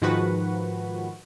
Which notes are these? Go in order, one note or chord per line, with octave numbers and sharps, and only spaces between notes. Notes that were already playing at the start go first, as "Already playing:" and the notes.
G#2 D#3 F3 F#4 B4 F#5